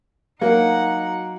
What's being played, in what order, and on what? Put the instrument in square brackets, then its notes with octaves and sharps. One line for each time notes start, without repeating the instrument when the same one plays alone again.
[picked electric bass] F#3 [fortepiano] A#3 [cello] D#4 F#5 [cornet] A#5